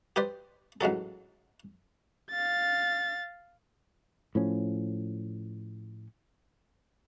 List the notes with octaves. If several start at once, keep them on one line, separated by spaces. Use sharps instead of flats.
G4 B4 C5 D5
A1 G#2 F#3 A4
F5 A6
A2 F3 C#4